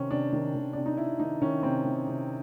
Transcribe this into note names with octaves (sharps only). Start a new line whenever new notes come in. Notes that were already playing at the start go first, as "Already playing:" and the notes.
Already playing: C3 D#3 C4 C#4
C3 D4
D#3
D#3
C3 D4
D#4
C3 E4
D#3 D#4
D#3 C#4
C3 C4
D#3
C3